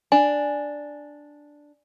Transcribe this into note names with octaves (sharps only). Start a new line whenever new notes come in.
D4 G#5